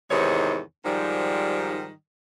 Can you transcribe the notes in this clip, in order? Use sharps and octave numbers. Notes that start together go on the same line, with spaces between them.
E2 G#2 C3 D#3 C#5
G#2 D#3 F3 G3